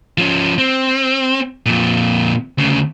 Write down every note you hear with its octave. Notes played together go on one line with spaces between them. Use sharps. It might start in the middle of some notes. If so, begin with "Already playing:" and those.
F3 C#4
C4
F2 A#2
D2 C#3